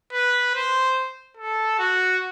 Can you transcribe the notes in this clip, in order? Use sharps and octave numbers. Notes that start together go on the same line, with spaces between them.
B4
C5
A4
F#4